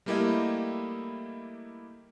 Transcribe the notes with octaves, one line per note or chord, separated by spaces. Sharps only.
G3 A3 A#3 E4 G4 D#5